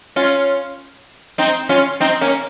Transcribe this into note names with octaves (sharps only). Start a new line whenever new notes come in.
C#4 F4
C4 D#4
C#4 F4
C4 D#4
A#3 C#4